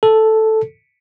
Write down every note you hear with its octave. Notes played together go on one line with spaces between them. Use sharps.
A4